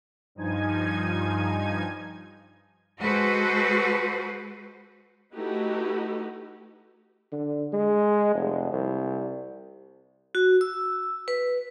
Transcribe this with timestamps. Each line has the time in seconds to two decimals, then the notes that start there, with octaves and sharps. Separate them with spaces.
0.35 G2 F3 D#4 G#5 G#6
3.01 G#3 F#4 A4 B4 C5
5.34 A3 D#4 E4 F#4 G4 B4
7.33 D3
7.73 G#3
8.35 F1
8.72 C2
10.35 F#4
10.61 E6
11.28 B4